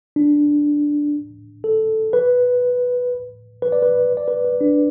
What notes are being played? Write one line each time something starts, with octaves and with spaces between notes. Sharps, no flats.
D4
A4
B4
B4
D5
B4
D5
B4
B4
D4